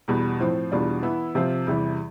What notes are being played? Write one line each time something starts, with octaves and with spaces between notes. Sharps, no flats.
E2 B2 G3
A2 F3 C4
E2 B2 G3 D4 F4
E3 B3 E4
C3 F3 C4 F4
E2 C3 E3 G3